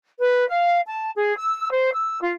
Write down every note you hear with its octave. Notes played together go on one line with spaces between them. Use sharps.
B4
F5
A5
G#4
E6
C5
E6
F4